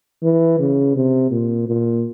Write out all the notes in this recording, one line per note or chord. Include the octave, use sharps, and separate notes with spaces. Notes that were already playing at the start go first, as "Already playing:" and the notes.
E3
C#3
C3
A#2
A#2